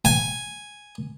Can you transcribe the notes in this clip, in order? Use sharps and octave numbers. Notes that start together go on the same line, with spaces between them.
G#5